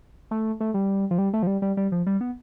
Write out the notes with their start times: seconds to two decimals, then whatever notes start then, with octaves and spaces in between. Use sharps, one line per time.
0.31 A3
0.60 A3
0.74 G3
1.11 F3
1.18 G3
1.33 A3
1.43 F3
1.47 G3
1.62 G3
1.77 G3
1.92 F3
2.07 G3
2.21 B3